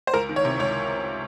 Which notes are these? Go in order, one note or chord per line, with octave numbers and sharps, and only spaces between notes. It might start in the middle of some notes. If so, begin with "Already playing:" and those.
C5
C#2 A#4
D#3
C#5
C3
C#2 C#5